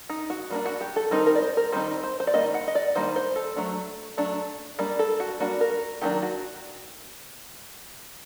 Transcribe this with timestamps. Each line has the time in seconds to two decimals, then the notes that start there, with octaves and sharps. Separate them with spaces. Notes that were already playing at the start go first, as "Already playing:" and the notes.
0.10 D#4
0.30 F#4
0.50 G3 A#3 D4
0.66 F#4
0.81 G4
0.96 A4
1.11 D#3 G3 C4 D#4 A#4
1.26 A#4
1.35 D5
1.42 C5
1.57 A#4
1.72 D#3 G3 C4 D#4 C5
2.03 C5
2.20 C5
2.27 D5
2.34 D#3 G3 A#3 D#5
2.54 F#5
2.68 D#5
2.75 D5
2.95 D#3 G3 A#3 D4 C5
3.16 C5
3.36 A4
3.56 F#3 A3 D4
4.17 F#3 A3 D4
4.79 G3 A#3 D4 D5
4.99 A4
5.20 F#4
5.40 G3 A#3 D4 F#4
5.61 A#4
6.02 D#3 F#3 A#3 D4 G4
6.22 F#4